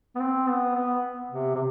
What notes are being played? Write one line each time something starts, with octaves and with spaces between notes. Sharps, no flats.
B3
C4
B3
B3
C3
C3